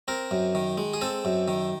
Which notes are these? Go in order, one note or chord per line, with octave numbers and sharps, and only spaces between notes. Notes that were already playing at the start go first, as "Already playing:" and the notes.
C4 A#4
F#2
D#3
G#3
G#4
C4 A4
F#2
D#3